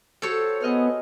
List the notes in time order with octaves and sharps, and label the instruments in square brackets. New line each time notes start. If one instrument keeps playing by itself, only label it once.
[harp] F#4 G4 C5 [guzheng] A4 C#5
[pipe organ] B3 [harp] G#4 D#5 F6